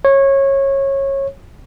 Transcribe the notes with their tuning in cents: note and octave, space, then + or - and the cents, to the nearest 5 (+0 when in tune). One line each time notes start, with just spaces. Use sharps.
C#5 -20